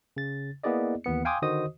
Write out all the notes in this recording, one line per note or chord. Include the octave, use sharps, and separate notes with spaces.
C#3 A6
A#3 B3 E4 G#4 D5 D#5
D#2 E3 B3 C#7
F5 G5 G#5 C6 D6 D#6
D3 D#3 F#4 C5 D#5 D#6